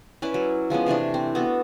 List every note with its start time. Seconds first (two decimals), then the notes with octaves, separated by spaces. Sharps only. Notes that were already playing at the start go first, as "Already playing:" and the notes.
0.22 C#4 E4 B4 D5
0.34 F#3
0.70 F3 G#3 B3 C#4
0.86 C3 E3 A3 D4
1.14 C4
1.35 B3 F#4 A4